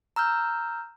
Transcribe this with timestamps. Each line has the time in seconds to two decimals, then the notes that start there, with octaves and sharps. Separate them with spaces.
0.16 A#5 E6 F6 G6